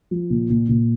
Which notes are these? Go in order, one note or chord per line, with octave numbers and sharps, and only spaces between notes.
F3
A#2
A#2
A#2